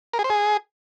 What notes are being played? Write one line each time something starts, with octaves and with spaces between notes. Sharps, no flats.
A#4
G#4
C5
G#4